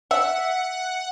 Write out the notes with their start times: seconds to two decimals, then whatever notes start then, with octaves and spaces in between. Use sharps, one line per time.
0.11 E5 F#5